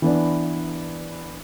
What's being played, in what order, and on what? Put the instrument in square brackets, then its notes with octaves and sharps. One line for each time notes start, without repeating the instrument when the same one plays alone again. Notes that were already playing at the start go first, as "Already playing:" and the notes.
[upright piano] E3 B3 D4